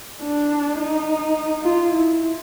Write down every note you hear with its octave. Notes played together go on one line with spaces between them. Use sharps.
D4
D#4
F4
E4